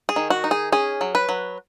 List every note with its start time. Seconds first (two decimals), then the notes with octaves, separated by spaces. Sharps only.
0.09 G#4
0.16 D#3
0.30 F#4
0.44 D#4
0.51 G#4
0.72 C#4 G#4
1.01 F#3
1.15 B4
1.29 F#3